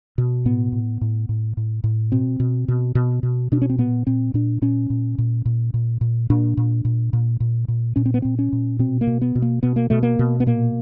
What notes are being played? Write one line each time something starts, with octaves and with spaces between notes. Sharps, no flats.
B2
A2 B3
A2
A2
A2
A2
A2
B2 C4
B2
B2
B2
B2
B2 D4
C#4
C4
A#2 B3
A#2 C4
A#2 D4
A#2 C#4
A#2
A#2
A#2
A#2
A#2
A#2 D4
A#2
A#2
A#2
A#2
A#2
A#2 C#4
C4
B3
A#2 C4
C#4
A#2
B2 C4
A#3
B2
B3
B2
A#3
B2 B3
A#3
B2 A3
A#3
B2
B3
A#2 A#3